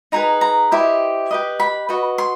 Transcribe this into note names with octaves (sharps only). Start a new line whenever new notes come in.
D#4 G#4 B4 A#5
A#5
E4 G4 C5 D#5
G4 B4 D#5
B5
F#4 B4 D#5
C6